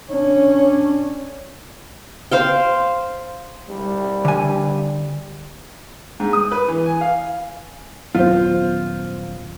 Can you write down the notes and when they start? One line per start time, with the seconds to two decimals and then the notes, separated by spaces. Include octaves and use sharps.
0.11 C#4 D4
2.31 C5 F5 G5
3.69 G3
4.25 D3 G#5
6.20 G#2
6.33 D#6
6.52 B4
6.68 E3
6.86 G#5
7.01 F5
8.15 D#1 F#2 B3 F4 C5